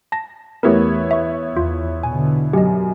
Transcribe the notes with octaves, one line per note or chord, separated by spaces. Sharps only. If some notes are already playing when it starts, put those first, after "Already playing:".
A5 A#6
E2 A3 B3 E4 G4 A#4 C#5
E5 C#6
E2 F4
B2 D3 G#5
F#2 G4 D#5